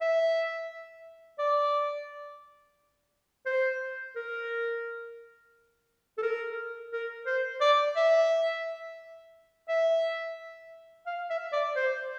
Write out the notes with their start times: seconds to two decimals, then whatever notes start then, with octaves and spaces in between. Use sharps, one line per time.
0.01 E5
1.39 D5
3.46 C5
4.16 A#4
6.18 A4
6.22 A#4
6.92 A#4
7.26 C5
7.61 D5
7.96 E5
9.69 E5
11.06 F5
11.30 E5
11.53 D5
11.76 C5